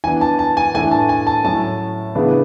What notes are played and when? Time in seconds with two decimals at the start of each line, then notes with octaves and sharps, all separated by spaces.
0.04 E3 B3 D4 G#5
0.21 A5
0.39 A5
0.57 G#5
0.74 A2 E3 A3 D4 G#5
0.91 A5
1.09 G#5
1.27 A5
1.44 A2 F#3 C#4 A5
2.15 C#3 E3 B3 D4